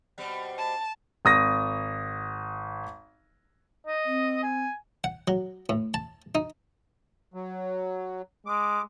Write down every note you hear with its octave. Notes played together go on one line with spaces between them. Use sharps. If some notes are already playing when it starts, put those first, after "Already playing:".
B2 G3 C4
A5
G#1 D#6 A#6
D#5
C4
G#5
F#5
F#3
A2
A5
D#4
F#3
G#3 D6